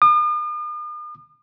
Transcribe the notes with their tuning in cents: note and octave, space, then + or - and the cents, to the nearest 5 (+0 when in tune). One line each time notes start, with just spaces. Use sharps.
D#6 -45